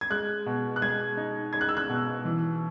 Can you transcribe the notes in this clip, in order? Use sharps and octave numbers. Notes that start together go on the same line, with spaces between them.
G#6
G#3 F#6
B2
F#6
G#3 G#6
D#4
G#3 G#6
F#6
E6
F#6
B2
E3